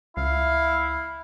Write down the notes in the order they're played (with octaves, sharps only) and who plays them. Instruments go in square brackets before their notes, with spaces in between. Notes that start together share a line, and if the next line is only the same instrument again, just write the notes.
[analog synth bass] C#2 [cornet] E4 [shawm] F5